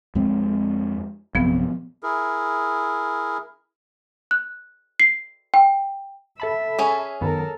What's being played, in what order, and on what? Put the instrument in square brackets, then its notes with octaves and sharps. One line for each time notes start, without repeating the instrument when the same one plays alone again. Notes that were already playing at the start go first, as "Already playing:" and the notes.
[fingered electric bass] F2 G#3 C4
[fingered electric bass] A#1 F#2 C3 [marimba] F3 B3
[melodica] E4 G#4 A#4
[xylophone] F#6
C7
G5
[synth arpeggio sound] A4 A5 B5 [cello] E5
[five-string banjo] C#4 G#4
[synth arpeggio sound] F#2 D#3 B3 [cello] A4 A#4